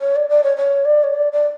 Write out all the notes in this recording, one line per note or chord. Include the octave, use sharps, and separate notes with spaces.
C#5
D5
D5
C#5
C#5
D5
C#5
D5
D5